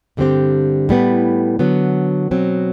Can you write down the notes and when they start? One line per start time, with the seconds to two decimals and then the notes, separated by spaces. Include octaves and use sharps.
0.17 G2 D3 G3 C4 G4
0.89 A2 G3 B3
1.59 D3 F#3 B3
2.31 B2 F#3 C4